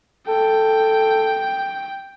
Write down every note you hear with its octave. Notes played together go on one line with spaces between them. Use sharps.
A4 G5